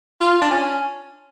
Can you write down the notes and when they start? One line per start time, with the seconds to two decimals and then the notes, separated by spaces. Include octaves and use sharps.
0.21 F4
0.41 D4
0.51 C#4